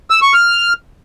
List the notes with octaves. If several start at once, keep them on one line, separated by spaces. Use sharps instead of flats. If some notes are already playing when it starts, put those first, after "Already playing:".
E6
C#6
F6